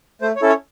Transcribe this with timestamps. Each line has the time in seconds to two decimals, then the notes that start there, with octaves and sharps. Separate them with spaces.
0.22 A3 C5
0.36 C#5
0.42 C#4 E4 A4
0.49 C#5